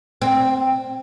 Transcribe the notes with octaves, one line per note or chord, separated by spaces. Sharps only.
C4